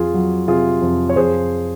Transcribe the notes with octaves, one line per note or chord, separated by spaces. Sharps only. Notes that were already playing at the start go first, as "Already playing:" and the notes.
Already playing: F2 F4 G#4
F#3
C3 F4 G#4
F2
C#5
F2 G#4 C5